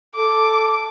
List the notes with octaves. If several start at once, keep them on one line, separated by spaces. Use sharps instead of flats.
A4 D6